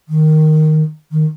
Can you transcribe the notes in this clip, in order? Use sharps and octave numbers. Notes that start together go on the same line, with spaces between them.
D#3
D#3